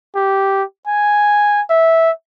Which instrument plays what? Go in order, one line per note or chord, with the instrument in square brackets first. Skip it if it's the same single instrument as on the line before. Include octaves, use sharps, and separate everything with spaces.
[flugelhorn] G4
G#5
E5